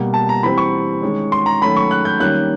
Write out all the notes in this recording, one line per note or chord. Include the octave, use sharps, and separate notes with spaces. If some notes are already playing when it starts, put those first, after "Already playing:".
Already playing: B2 G3 A#3
A5
A#5
E3 G3 C4 B5
C#6
D#3 G#3 C#4
C6
A#5
D#3 F#3 A3 C#4 B5
C#6
F#6
G6
D#3 G3 A#3 C#4 F#6